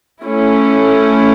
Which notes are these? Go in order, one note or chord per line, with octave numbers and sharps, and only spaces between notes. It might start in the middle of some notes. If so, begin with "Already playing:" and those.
A3 C#4 E4